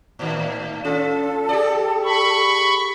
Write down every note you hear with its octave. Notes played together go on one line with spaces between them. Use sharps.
A2 D#3
C#4 F4 A4
G4 G#4 D5
B5 C#6